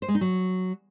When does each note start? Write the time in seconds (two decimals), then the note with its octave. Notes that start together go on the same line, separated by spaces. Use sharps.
0.02 C5
0.08 G#3
0.15 D#4
0.21 F#3